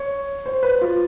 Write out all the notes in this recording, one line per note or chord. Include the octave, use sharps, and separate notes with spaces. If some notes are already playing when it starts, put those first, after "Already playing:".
Already playing: C#5
C5
B4
F4